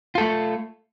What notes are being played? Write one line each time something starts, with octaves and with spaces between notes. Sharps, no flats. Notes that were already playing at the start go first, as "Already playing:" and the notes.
A3 F4 A4